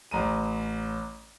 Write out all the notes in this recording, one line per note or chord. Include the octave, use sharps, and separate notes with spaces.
A1 A#5 D#7